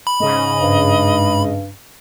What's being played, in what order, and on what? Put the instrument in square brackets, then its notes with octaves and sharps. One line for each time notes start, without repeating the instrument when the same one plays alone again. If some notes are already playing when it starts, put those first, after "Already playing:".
[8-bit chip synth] B5
[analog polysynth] G#2 C#3 [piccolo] D#5
[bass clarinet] G2